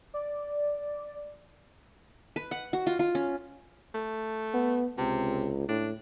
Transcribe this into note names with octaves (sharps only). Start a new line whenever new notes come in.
D5
B4
F#5
F#4
F4
F4
C#4
A3
B3
C#2 C3
A2 D4